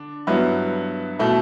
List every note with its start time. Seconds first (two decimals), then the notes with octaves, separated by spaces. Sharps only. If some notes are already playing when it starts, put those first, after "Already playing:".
Already playing: D3 D4
0.27 G2 F#3 B3 E4
1.19 B2 A3 E4